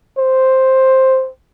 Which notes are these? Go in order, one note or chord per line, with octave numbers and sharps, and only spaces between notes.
C5